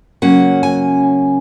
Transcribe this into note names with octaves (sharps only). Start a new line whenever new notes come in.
C#3 F#3 A#3 C#4 F#5
G#5